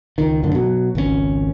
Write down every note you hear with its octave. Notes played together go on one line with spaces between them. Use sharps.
C#2 D#3
F#2 A2 D3 D#3
B2 F#3
G#1 C#2 D3 C#4